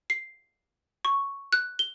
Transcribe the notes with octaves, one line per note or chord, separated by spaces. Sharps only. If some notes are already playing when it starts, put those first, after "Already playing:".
C7
C#6
F#6
G7